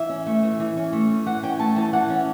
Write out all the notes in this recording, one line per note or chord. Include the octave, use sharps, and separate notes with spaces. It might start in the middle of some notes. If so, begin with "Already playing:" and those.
Already playing: E3 E5
C#4
A3
E3
E3
C#4
A3
E3
E3 F#5
C#4 G5
A3 A5
E3 A5
E3 F#5
C#4